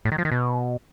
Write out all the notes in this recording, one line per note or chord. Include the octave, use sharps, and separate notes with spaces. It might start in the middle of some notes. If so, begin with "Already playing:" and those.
A2
D#3
F3
D#3
B2